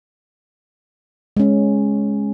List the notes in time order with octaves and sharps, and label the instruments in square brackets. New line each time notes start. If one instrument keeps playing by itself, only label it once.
[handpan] G#3 C#4